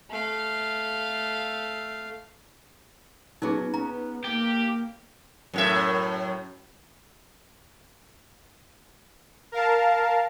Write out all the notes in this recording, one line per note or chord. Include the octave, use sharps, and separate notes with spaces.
A3 F5
F#3 B3 C#4 D#4 G#4
B3 C#4 A#5
A#3 G4
F#2 A2 E5
A#4 F5 A5